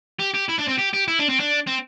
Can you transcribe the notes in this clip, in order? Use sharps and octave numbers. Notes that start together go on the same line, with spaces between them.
G4
G4
E4
D4
C4
G4
G4
E4
D4
C4
D4
C4